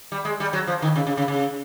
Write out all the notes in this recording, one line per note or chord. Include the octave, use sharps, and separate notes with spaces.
G3
G#3
G3
F#3
F3
D#3
C#3
C#3
C#3
C#3